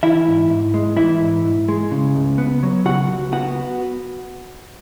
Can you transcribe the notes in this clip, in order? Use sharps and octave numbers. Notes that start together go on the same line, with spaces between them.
E3 E4 E5
G#2
G#2
G#3
E3 E4 E5
G#2
G#2
G#3
C#3
C#2
B3
F#3
C#3 F#4 F#5
C#2
B3 F#4 F#5